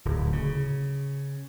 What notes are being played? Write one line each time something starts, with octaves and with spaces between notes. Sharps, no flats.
D1
C#3